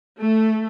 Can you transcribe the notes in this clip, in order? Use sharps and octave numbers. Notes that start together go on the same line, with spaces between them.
A3